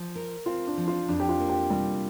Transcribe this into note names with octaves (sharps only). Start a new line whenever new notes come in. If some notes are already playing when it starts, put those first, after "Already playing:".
Already playing: F3
A#4
C4 F4
D4
F3
F4
F2 D4
G4
F4
A#3
G4
C3 G3